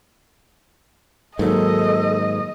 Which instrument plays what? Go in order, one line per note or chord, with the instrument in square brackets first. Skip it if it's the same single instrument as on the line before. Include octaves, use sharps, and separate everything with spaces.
[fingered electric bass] G#2 [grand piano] D#3 F#3 A#3 [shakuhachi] A4 [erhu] D#5